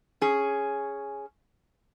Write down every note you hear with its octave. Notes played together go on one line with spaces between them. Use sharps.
C#4 G#4